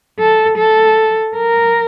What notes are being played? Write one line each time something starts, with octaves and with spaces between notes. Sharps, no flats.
A4
A4
A#4